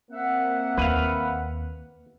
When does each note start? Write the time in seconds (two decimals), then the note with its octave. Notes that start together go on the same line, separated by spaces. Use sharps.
0.11 A#3 C4 E5 F#5
0.78 D#2 B4 F5